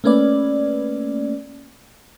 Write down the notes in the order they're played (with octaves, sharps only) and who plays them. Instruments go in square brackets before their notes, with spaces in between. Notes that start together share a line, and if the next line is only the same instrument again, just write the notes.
[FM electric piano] A3 A#3 C#4 B4 D5